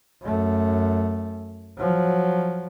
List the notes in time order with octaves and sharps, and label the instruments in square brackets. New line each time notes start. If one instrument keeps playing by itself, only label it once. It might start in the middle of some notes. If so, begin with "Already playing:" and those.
[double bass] F#2 A3
F3 F#3